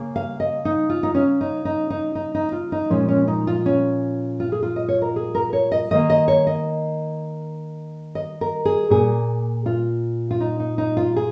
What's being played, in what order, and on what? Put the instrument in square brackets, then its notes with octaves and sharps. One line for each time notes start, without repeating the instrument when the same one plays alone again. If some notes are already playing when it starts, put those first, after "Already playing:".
Already playing: [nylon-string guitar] C#3 A#3
F5
D#5
D#4
F4
D#4
C#4
D#4
D#4
D#4
D#4
D#4
F4
D#4
A#2 F3 G#3 C#4
C#4
D#4
F4
C#4
F4
G#4
F4
D#5
C#5
A#4
G#4
A#4
C#5
D#5
D#3 A#3 D#5
D#5
C#5
D#5
D#5
A#4
G#4
A#2 A#3 G#4
F4
F4
D#4
D#4
D#4
F4
G#4